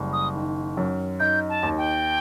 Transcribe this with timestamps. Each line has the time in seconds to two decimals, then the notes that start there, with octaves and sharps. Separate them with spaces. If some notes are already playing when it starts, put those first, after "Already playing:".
Already playing: F#1 G3
0.13 D#6
0.34 D#3
0.77 F#2
1.20 D#4 G6
1.49 A5
1.63 D#2
1.77 G5